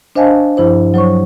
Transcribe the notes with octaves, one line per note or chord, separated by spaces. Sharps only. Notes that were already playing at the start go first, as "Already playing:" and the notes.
D4 C5 D#5 F5 G#5 A5
G2 F3 E4 C5
F#3 C5 C#5 C#6